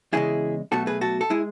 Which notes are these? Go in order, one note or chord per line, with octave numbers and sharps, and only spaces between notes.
E2 C#3 G#3 E4 G#4
B1 B2 A3 F#4 A4
G#4 B4
F#4 A4
A4
G#3 E4 G#4